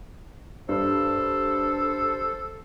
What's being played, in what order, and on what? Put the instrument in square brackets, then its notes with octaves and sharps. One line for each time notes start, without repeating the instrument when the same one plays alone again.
[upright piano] G2 [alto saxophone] A4 [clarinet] C5